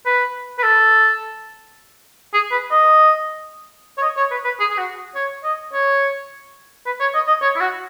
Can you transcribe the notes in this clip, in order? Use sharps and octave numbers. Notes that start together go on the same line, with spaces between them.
B4
B4
A4
G#4
B4
D#5
C#5
D#5
C#5
B4
B4
G#4
G#4
F#4
C#5
D#5
C#5
B4
C#5
D#5
D#5
C#5
E4
F#4